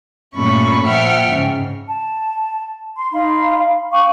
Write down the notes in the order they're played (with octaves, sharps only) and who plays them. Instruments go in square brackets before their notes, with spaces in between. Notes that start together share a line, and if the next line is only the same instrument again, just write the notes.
[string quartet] G2 A#2 A3 C#4 B5 C#6
A#2 F3 E5 F#5 G5 F6
G#2 C#3
[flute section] A5
C6
D#4 F5 B5 C6
F5 G5 C#6 D6